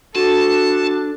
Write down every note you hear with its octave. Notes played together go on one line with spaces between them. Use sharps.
D4 F#4 A4 A5